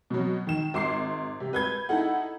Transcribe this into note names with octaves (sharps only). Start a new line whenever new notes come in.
B2 F#3
D#3 E7
G#1 C6 D6 C7
C3
B4 G6 G#6
D#4 E4 A4 F#5